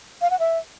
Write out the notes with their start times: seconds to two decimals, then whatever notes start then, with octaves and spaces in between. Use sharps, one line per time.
0.21 F5
0.31 F#5
0.40 E5